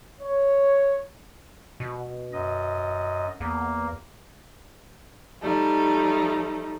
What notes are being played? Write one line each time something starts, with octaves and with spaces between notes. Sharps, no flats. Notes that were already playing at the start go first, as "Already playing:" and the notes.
C#5
B2
F#2 D#5
E2 A#3
F3 G3 A3 D#4